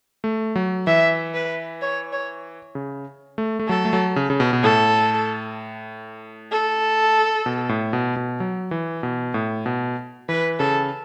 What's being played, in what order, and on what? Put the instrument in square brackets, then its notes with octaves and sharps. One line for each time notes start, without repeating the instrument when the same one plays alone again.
[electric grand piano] A3
F#3
[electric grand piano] E3 [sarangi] E5
[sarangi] B4
C#5
C#5
[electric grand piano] C#3
A3
A3
[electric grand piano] F#3 [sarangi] A4
[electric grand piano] A3
F#3
C#3
C#3
B2
B2
[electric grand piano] A2 [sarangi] A4
[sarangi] A4
[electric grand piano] B2
A2
B2
B2
F#3
E3
B2
A2
B2
[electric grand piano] E3 [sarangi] B4
[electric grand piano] C#3 [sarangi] A4